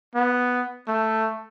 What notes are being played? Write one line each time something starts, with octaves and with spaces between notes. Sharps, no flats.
B3
A3